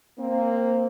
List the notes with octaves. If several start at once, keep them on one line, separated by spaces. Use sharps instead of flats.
A#3 C4